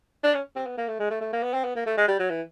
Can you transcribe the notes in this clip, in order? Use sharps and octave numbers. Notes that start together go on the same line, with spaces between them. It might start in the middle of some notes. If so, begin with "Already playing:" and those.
D4
C#4
C4
B3
A#3
A3
G#3
A3
A3
A#3
B3
C4
B3
A#3
A3
G#3
G3
F#3
E3